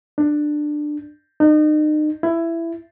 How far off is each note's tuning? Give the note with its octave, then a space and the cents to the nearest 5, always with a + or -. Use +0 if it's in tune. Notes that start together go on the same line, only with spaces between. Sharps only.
D4 +15
D#4 -35
E4 +15